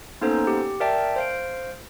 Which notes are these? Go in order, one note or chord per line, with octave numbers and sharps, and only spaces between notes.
A#3 B3 C#4 D#4 A4 C5
G4
A#4 D5 E5 G5 A5
C5 F5 D7